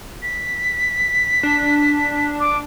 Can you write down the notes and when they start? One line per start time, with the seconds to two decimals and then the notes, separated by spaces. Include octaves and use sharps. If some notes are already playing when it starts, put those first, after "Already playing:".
0.22 B6
1.43 D4
2.40 D6